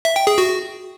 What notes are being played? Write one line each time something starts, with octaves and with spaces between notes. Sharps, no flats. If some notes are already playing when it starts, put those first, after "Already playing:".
E5
G5
G#4
F#4